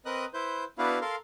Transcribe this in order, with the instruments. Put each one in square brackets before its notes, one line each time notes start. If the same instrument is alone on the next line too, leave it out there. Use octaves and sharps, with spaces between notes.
[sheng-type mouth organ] C4 A#4 B4 D#5 D#6 F#6
E4 B4 C5 G6
B3 D4 E4 F#4 B4 F5
A4 A#4 F5 C6